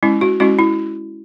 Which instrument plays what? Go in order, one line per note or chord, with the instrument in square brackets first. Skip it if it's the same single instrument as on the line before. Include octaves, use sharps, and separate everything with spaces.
[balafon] G#3 C#4 E4
F#4
G#3 C#4 E4 F#4
E4